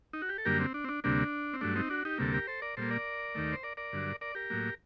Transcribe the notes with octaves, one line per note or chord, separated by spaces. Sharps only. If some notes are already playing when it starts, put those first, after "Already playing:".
D#4
F#4
G4
A4
F#2 D3 G3 A#3 G4 A#4
C4
D4
C4
D4
D2 C3 G3 A#3 D4
C4
G2 F#3 A3 D4
C4 D#4
D4 F#4
D#4 G4
D2 C3 G3 A#3 A4
G4 A#4
A4 C5
A#4 D5
A#2 G3 A#3 A4 C5
A#4 D5
D#2 D#3 A3
C5
A#4 D5
A#4 D5
G2 D3 F#3
A#4 D5
G4 A#4
A2 F#3 A#3